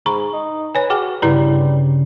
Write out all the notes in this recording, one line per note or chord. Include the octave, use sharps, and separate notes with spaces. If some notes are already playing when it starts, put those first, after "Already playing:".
G#2 A#5 B5 C#6
D#4
B4 C#5 G#5
F#4 G#4 G5 D6
G2 C#3 G3 E4 B4 A#5